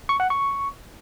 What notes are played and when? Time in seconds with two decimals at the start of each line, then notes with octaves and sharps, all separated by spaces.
0.09 C#6
0.20 F#5
0.30 C#6